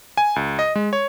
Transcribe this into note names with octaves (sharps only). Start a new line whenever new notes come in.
G#5
C#2
D#5
G#3
C#5